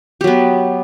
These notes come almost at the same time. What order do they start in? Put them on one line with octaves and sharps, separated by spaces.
G4 F#3 B3